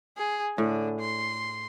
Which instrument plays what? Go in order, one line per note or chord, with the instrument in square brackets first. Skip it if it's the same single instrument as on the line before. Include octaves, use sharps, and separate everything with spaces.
[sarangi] G#4
[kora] A2 [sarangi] D3
[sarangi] C6